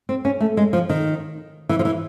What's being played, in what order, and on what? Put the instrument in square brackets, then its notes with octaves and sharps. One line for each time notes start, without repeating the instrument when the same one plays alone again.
[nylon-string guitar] C4
C#4
A3
G#3
F3
D#3
E3
F3
E3